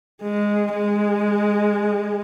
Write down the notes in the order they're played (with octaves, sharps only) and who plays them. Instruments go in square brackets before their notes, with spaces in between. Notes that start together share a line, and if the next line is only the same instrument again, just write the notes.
[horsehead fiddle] G#3
G#3